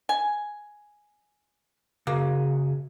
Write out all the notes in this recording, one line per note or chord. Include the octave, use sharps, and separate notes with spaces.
G#5
C#3 A#3 F#4 G#4